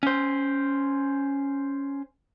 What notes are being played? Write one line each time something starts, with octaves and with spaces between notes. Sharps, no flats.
C#4 C5